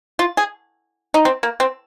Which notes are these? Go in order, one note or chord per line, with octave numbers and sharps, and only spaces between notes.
F4
G#4
D#4
C4
A#3
C4